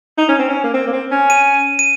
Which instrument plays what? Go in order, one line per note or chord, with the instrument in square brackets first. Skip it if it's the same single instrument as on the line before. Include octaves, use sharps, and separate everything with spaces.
[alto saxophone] D#4
C#4
C4
C#4
A#3
C4
A#3
C4
C#4
[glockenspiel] D#7
D#7